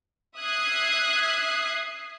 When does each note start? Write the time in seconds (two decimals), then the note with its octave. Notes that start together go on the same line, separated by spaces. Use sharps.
0.38 E5 D#6 F#6 G#6 C7